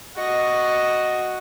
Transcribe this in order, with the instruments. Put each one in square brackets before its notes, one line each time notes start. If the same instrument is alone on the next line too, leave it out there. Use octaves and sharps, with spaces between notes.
[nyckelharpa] F#4 D#5